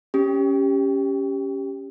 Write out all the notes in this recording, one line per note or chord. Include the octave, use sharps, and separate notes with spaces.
C#4 G4